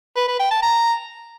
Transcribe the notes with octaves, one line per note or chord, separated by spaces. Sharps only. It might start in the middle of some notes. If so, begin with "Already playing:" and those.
B4
B4
G5
A5
A#5